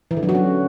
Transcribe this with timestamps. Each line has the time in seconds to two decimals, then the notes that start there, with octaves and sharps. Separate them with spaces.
0.11 E3
0.17 D3
0.23 F#3
0.29 F#4
0.35 C#4